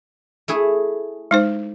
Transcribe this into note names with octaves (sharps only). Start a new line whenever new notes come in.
A3 E4 G#4
G#3 D#4 C5